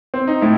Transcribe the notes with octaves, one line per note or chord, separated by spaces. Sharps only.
C4
D#4
A2 E4